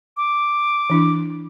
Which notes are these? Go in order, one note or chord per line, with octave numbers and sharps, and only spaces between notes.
D6
E3 D4 E4